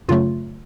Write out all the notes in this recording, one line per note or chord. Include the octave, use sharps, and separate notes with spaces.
F#2 C#3 F#3 A3 F4